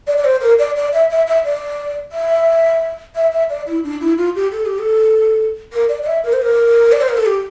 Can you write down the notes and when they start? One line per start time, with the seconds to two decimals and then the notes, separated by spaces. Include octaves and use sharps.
0.07 D5
0.17 D5
0.24 C5
0.41 A#4
0.59 D5
0.76 D5
0.92 E5
1.10 E5
1.27 E5
1.44 D5
2.12 E5
3.15 E5
3.32 E5
3.50 D5
3.67 E4
3.84 D4
4.00 E4
4.18 F4
4.35 G4
4.51 A4
4.65 G4
4.79 A4
5.72 A#4
5.89 D5
6.02 D5
6.06 E5
6.24 A#4
6.33 C5
6.42 A#4
6.92 D5
7.01 C5
7.09 A#4
7.17 A4
7.26 G4